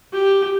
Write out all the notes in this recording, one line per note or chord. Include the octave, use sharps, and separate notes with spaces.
G4